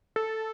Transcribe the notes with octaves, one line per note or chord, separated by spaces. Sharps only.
A4